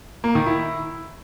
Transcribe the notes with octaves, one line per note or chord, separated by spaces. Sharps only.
A#3
D#3
E4